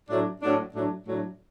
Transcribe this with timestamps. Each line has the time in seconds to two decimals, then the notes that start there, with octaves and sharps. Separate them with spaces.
0.10 A2 F#3 A3 D4
0.42 A2 F#3 A3 D4
0.74 A2 F#3 A3 D4
1.07 A2 F#3 A3 D4